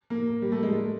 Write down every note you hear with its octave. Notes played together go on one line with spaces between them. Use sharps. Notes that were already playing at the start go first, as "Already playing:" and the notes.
A#3
G3
A3
G#3